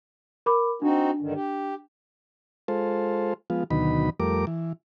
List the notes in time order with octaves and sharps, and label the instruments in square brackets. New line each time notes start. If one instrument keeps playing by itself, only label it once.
[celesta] A#4 B5 D6
[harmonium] C4 D#4 F#4 [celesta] D4
[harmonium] G2 D3 D#3
G4
[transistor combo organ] G#3 F4 A4 C5
F3 G#3 B3 F4
D2 B2 D#3 F#3 D#4 B5
F2 G3 A3 A#4 D6
E3